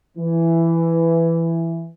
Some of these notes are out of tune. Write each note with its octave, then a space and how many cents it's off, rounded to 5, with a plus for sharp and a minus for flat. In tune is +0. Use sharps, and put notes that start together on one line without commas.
E3 +10